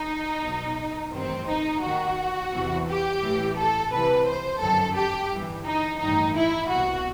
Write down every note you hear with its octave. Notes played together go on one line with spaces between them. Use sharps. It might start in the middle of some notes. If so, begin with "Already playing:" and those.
Already playing: D#4
B1 B2
A1 G2 D#3 C4
D#4
D#2 D#3 F#4
E2 C3 E3
G4
A1 A2 E3
A4
C2 C3 E3 B4
C5
G1 F#2 D#3 A4
G4
G1 G2 E3
D#4
A1 G2 D#3 D#4
E4
C2 B2 F#4